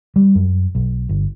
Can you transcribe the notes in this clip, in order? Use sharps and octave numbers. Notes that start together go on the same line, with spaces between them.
G3
F#2
B1
G1